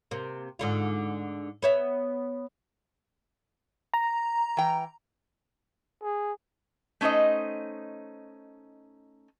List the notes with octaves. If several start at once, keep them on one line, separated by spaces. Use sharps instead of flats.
C3 A#3
G#2 D3 F4
B3 C#5 E5
A#5
E3 G5
G#4
A3 C#4 D#4 C5 D#5